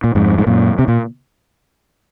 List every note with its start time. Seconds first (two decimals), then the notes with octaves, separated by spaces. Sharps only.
0.04 A#2
0.15 F2 G#2
0.38 G#2
0.47 F#2 A#2
0.79 C3
0.88 A#2